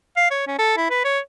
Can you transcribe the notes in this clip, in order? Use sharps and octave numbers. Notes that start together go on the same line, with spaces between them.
F5
C#5
C#4
A4
E4
B4
C#5